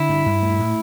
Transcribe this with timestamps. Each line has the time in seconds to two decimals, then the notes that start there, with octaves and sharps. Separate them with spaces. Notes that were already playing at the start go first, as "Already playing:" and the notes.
Already playing: D3 E4
0.09 G2
0.26 G2
0.43 A3
0.59 A2